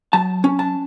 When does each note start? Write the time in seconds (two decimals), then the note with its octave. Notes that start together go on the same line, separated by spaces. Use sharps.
0.13 F#3 A5
0.44 C#4
0.59 A5